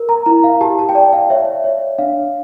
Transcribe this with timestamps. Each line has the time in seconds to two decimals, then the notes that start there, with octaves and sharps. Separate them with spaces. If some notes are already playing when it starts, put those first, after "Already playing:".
Already playing: A#4
0.09 A#5
0.26 E4 A#5
0.44 F5
0.61 G4 A5
0.79 A5
0.89 G5
0.95 D5 A5
1.13 F5
1.30 C#5 E5
1.64 C#5
1.98 D4 F5